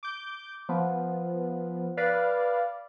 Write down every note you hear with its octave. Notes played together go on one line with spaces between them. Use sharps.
D6 G6
F3 B3
B4 D5 F5